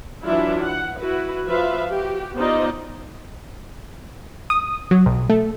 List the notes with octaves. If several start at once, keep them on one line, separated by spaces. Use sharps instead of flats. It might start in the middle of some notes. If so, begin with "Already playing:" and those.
E3 F#3 D4 E4 F4 E5
F#5
E4 F#4 B4
F3 F4 B4 E5 F5
F#4 G4
B3 D#4 F4 C5 D5 D#5
D#6
F#3
B1
A3